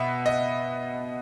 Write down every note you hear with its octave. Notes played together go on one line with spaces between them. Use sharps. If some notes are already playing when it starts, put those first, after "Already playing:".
Already playing: B2 B3 E5
D#5